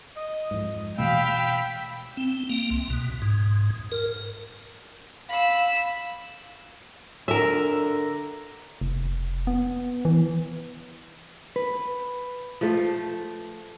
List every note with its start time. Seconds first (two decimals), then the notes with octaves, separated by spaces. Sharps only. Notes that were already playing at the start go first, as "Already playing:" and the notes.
0.16 D#5
0.51 F2 G#2
0.98 B2 E3 A3 F5 G5 B5 E6 B6
2.17 C4
2.50 A#3
2.70 C2
2.90 B2
3.22 G#2
3.92 A#4
5.29 F5 B5 E6
7.28 D3 A#4 E5
8.81 F1
9.47 B3
10.05 E3
11.56 B4
12.61 F3 A3